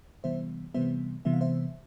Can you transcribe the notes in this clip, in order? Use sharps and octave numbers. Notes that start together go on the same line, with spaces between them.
C3 E3 G3 B3 C5 E5
C3 E3 G3 B3 C5 E5
C3 E3 G3 B3 E5
F5
C5 E5